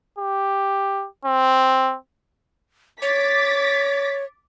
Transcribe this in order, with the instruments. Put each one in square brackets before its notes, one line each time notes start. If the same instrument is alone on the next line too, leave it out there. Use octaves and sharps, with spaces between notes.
[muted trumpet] G4
C4
[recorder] C#5 [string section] D6 A6 B6